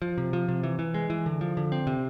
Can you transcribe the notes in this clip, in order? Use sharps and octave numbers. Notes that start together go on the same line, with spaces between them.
F3
C3
F3
C3
E3
E3
G#3
E3
D3
F3
D3
C4
C3